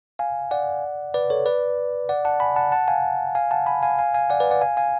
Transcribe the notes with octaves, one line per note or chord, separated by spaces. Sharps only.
F5 G#5
D5 F#5
B4 D5
A4 C#5
B4 D5
D5 F#5
F#5 A5
G#5 B5
F#5 A5
F#5 A5
F5 G#5
F5 G#5
F#5 A5
G#5 B5
F5 G#5
F5 G#5
F5 G#5
D5 F#5
B4 D5
D5 F#5
F5 G#5
F5 G#5